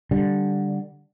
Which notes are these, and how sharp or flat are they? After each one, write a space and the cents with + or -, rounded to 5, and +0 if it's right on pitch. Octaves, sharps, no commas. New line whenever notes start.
D3 +0 G3 +0